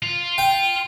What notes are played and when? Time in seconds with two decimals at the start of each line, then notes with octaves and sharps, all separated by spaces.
0.02 F4
0.38 G5